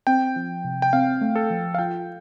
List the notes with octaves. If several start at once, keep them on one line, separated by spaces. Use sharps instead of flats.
C4 G5
F3
C3
G5
C4 F5
A3
A4
F3
F5
F4 G5